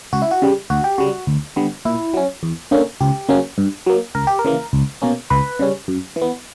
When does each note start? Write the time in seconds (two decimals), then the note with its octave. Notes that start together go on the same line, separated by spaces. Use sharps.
0.13 C#2 F#4
0.22 E4
0.31 F#4
0.42 C#3 G3
0.70 D2 F#4
0.84 G4
0.98 C#3 G3 F#4
1.27 D2
1.56 D3 G3 B3
1.85 A#2 E4
2.14 F#3 C#4
2.43 E2
2.71 D3 A#3 C#4
3.01 C#2 G4
3.29 C#3 F#3 A#3 C#4
3.58 G2
3.86 F#3 A#3
4.15 C#2 A#4
4.27 G4
4.39 A#4
4.45 C#3 E3 A#3
4.73 C#2
5.02 B2 A#3 C#4
5.30 C#2 B4
5.59 C#3 G3 C#4
5.88 F#2
6.16 E3
6.22 B3